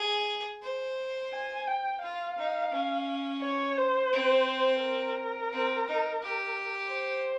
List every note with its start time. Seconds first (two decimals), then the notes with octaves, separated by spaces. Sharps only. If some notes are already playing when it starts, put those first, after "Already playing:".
Already playing: G#4
0.62 C5
1.33 G#5
1.67 G5
2.02 F4 F5
2.38 D#4
2.72 C#4
3.42 C#5
3.77 C5
4.13 C4
4.82 A#4
5.52 C4
5.87 D#4
6.22 G4
6.92 C5